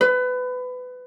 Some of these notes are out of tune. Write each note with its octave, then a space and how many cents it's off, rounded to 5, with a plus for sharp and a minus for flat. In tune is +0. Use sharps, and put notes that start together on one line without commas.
B4 +25